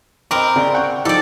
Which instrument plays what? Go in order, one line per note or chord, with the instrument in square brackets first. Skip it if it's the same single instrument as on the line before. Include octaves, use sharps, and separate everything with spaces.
[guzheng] C4 A#4 A#5 [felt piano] D#5 B5 D6
[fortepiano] C#3 [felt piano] D5
[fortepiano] F#5 G5 C#6
[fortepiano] F3 D6 [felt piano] D#4 [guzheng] A4 D5